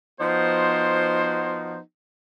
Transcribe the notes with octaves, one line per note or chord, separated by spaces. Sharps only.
F3 B3 D#4 F#4 C5